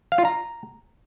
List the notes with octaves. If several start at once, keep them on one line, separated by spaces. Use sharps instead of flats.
F5
F4
A#5